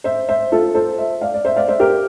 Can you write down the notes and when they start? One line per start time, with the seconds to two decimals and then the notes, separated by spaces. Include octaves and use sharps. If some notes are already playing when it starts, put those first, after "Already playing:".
0.04 C5 E5
0.29 C5 E5
0.52 F4 A4
0.75 A4 C5
0.98 C5 E5
1.21 D5 F5
1.34 D5
1.45 C5 E5
1.56 D5 F5
1.68 C5 E5
1.80 G4 A#4